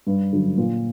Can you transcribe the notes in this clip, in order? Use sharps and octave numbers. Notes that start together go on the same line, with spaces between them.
G2
D3 F#3
A#2